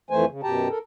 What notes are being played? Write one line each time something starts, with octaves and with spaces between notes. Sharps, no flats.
F2 E3 A3 C5 G#5
C#3
F#2 B2 G4 G5 A5 A#5
A4 A#4